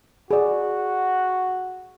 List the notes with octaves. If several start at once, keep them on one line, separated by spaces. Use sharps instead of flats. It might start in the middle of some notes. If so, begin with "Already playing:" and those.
F#4 G#4 D5